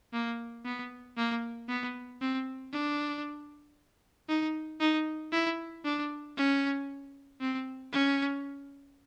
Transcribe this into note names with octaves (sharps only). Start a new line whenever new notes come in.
A#3
B3
A#3
B3
C4
D4
D#4
D#4
E4
D4
C#4
C4
C#4